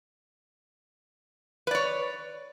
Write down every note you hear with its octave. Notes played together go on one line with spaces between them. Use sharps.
B4 C#5 D5